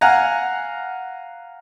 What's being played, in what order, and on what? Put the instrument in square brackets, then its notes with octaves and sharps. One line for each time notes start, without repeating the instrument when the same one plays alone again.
[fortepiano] F5 F#5 G#5 A#5